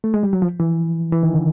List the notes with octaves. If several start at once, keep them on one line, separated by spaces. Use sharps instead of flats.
A3
G#3
G3
F#3
F3
E3
E3
D#3
D3